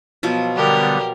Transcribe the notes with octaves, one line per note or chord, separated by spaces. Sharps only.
B2 F3 F#3
D3 G3 B3 G4 A#4